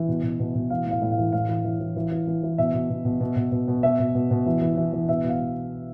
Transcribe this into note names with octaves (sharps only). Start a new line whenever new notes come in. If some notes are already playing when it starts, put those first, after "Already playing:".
Already playing: E3
B2
B2
B2
B2
E3 F5
A2
F5
A2
F5
E3
A2 F5
E3
E3
E3
E3
E3
E3
E3
B2 E5
B2
B2
B2
B2
B2
B2
B2
B2 E5
B2
B2
B2
E3
E3
E3
E3
B2 E5
B2 F5
B2